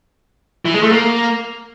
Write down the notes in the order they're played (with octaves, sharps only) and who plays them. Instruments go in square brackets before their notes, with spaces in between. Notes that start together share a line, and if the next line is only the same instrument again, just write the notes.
[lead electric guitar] E3
G#3
A3
A#3